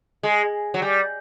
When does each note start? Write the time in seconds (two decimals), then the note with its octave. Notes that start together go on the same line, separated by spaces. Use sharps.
0.23 G#3
0.74 F#3
0.82 G3